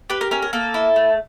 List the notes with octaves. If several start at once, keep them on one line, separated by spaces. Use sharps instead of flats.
G4 B4
A#4
C#4 A#4
A#4
A#3 A4
E4
A3